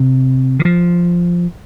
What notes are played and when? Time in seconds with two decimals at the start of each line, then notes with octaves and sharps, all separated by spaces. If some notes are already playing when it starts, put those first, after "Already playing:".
Already playing: C3
0.60 D#3
0.65 F3